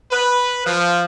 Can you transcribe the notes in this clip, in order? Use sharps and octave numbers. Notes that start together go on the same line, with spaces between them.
B4
F3